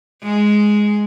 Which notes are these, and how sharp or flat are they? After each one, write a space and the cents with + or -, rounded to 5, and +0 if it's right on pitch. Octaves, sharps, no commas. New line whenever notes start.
G#3 +5